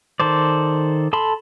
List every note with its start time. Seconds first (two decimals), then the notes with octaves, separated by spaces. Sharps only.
0.20 D#3 A4 C5 D5
1.13 A4 A5 B5 C6